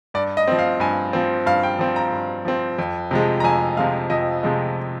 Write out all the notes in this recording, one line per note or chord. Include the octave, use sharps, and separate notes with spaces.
G2 D5
D#5
F3 C4
F5
G2 G#5
F3 C4
G2 F5
G5
F3 C4
A#5
G2
F3 C4
F2
C3 F3 G#3
A#5
F2 G#5
C3 F3 G#3 F5
F2 D#5
C3 F3 G#3